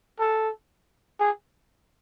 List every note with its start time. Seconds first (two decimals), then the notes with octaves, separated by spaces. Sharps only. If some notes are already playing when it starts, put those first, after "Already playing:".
0.19 A4
1.20 G#4